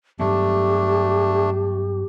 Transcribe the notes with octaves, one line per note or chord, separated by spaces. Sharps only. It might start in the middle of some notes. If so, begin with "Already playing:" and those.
G2 F#3 A3 B3 D4 G4